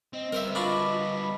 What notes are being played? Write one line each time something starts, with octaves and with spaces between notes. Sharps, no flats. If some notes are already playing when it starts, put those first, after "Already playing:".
C4 D#5
G3 B3 A#4 C5 E5
D4 F4 F#4 D#5 B5